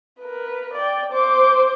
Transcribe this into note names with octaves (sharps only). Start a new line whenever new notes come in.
A#4 B4
D5 G5
C5 D6